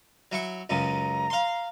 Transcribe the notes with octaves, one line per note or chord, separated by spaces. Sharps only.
F#3 E4 C#6
C#2 F#2 C#3 A#5
F5 C6